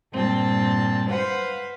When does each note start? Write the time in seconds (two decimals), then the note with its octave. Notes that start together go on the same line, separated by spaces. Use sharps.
0.12 G2 A#2 C4 A5
1.08 B4 C5 F5 F#5